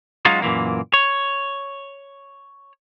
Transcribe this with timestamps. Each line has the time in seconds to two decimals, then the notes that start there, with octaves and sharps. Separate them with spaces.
0.25 F#3 G#3 C#4 D#4 F4 F#4
0.42 F#2 A#2 E3 A#3
0.94 C#5